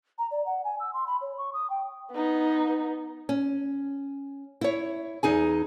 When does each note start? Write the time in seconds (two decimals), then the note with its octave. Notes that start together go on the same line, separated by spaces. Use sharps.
0.19 A#5
0.31 D5
0.46 F#5
0.64 G#5
0.80 E6
0.94 C6
1.07 B5
1.21 C#5
1.38 C#6
1.53 D#6
1.70 G5
2.11 B3 D#4
3.29 C#4
4.61 E4 C#5
5.23 E2 D#4 G#4 G#5